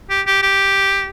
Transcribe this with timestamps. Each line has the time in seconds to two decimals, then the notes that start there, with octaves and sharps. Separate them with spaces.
0.10 G4
0.27 G4
0.43 G4